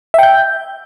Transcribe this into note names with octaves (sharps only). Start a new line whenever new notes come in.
E5 G5 G6